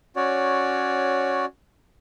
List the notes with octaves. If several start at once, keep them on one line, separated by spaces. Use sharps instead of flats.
C#4 F#4 C#5 D5